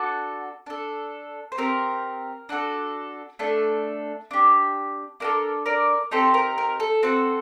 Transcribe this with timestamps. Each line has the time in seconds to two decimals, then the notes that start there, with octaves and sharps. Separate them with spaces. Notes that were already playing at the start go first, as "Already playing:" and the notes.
Already playing: D4 F#4 A4 F#5 A5
0.66 D4 A4
1.52 C5
1.58 C4 G4 A#4
2.49 D4 F#4 A4
3.39 A3 D4 A4
4.31 D4 G4
5.20 D4 F#4 A4 A#4
5.66 A#4 D5
6.11 C4 D#4 G4 A4 C5
6.34 A#4
6.58 A#4
6.80 A4
7.03 C4 F#4 A4